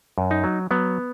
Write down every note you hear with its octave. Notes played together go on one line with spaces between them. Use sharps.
F#2
D#4
F#3
F#3 B3